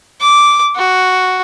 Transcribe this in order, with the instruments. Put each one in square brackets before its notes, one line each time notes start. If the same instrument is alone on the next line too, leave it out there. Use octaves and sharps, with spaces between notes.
[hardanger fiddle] D6
F#4